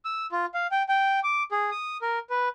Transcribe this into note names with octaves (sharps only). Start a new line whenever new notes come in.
E6
F4
F5
G5
G5
D6
G#4
D#6
A#4
B4